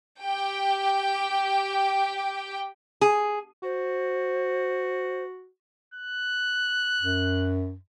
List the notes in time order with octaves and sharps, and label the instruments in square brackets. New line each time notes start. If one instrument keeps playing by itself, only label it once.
[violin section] G4 G5
[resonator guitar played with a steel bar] G#4
[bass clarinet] F#4 [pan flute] C5
[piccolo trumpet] F#6
[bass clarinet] F#2